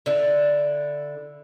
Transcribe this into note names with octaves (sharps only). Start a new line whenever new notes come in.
D3 E4